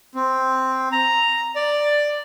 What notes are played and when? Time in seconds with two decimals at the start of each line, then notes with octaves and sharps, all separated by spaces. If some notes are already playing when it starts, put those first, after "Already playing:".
0.15 C4
0.92 A#5
1.56 D5